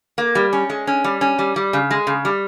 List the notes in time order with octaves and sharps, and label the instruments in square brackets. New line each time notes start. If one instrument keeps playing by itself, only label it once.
[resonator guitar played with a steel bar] A#3
G3
C#4
G#3
C#4
G3
C#4
G3
G3
C#3
G#3
C#3
G3